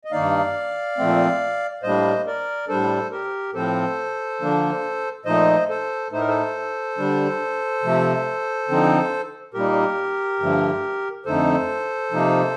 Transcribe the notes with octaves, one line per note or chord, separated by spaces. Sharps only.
D#5
G2 D#3 A#3 D#4 D5 F5
A#2 F3 A3 C4
A2 G3 A#3 D4 C5 D#5
A#4 D5
A2 G3 D4 A4 C5
G4 A#4
A2 F3 C4 A4 C5
D3 F3 A#3 D4
A#2 F3 A3 D#4 C5 D#5
A4 C5
A2 A3 D#4 C5
A#4
A4 C5
D3 G3 D4
C3 F3 A3
D3 F3 C4 D#4
A#2 G3 A#3 D#4 G4 A#4
G2 D3 F3 A3
F2 D3 A3 D#4 A4 C5
C3 F3 A#3 D#4